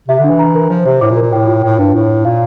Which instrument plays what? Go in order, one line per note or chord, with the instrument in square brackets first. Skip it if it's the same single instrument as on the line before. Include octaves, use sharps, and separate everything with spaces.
[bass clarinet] C3 [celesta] E5
[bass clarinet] D3
[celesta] D4
[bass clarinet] E3
[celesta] A#5
A#4
[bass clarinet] F3 [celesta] C5
[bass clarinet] C3 [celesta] C5
[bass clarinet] A2 [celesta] D6
[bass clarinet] A#2
[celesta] A#4
[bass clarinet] A#2
[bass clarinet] A2 [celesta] G5
[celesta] F4
[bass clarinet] A2 [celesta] G5
[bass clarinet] G2 [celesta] D4
[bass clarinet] A2 [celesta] E4
[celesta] E4
[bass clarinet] A#2 [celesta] F5